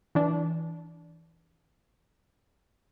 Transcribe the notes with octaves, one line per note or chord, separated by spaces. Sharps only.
E3 D4